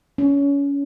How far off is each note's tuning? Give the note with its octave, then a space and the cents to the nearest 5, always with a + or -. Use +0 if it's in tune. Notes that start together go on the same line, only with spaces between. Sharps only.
C#4 +25